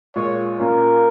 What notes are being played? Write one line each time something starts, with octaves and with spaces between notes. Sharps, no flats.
A#2 G#3 F4 C#5
A#2 A#3 C#4 F4 A#4